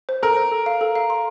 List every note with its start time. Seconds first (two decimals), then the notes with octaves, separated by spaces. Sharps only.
0.09 C5
0.23 A4 A#4
0.37 C5
0.51 A4
0.66 F5
0.81 A4
0.95 F5
1.10 C6